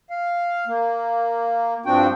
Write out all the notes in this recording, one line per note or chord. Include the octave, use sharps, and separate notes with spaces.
F5
A#3
G2 F3 C4 D4 F#4 G5